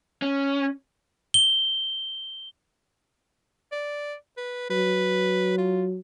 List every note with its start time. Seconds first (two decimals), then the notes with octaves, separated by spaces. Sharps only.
0.22 C#4
1.34 G7
3.72 D5
4.37 B4
4.70 F#3 B4
5.58 F4